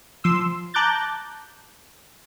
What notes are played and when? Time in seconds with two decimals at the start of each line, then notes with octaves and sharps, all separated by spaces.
0.24 F3 C6 E6
0.74 A5 A#5 D6 F#6 G6 A6